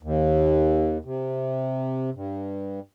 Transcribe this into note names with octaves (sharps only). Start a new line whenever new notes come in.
D#2
C3
G2